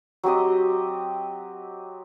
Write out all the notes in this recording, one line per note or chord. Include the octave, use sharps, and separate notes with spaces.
F#3 C4 G4 D#5